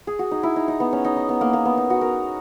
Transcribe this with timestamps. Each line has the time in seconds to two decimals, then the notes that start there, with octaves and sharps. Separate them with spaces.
0.07 G#4
0.19 F#4
0.31 D#4
0.43 E4
0.56 D#4
0.68 D#4
0.80 B3
0.93 C#4
1.05 D#4
1.17 D#4
1.29 B3
1.41 A#3
1.53 A#3
1.65 B3
1.77 D#4
1.90 F#4
2.01 A#4